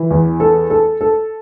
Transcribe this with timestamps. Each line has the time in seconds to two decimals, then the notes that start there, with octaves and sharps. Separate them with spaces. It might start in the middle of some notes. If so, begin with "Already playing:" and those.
Already playing: E3
0.11 E2
0.40 A4
0.70 A4
1.01 A4